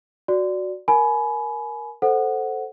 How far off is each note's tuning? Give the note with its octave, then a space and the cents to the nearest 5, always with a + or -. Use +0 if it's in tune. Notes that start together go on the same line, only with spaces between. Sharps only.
F#4 +0 D5 -5
A#4 +10 G#5 +25 B5 +0
A4 +0 C5 +0 F#5 +0